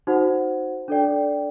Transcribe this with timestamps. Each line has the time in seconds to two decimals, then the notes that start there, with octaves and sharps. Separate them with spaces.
0.07 D#4 F#4 C5 F#5
0.88 D4 A4 D5 G5